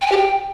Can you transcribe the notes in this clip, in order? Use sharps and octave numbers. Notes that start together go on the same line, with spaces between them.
G5
G#5
G4
G5